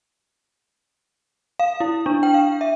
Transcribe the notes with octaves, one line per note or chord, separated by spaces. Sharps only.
F5
E4
D4
G5
F5
E5